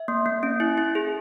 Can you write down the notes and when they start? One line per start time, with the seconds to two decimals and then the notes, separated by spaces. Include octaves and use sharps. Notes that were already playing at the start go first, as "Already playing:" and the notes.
Already playing: E5
0.08 A#3
0.26 A#3
0.43 C#4
0.60 E4
0.78 E4
0.95 G#4